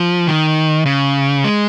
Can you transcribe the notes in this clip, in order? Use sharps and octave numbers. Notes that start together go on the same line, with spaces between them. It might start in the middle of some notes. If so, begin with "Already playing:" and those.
Already playing: F3
D#3
C#3
G#3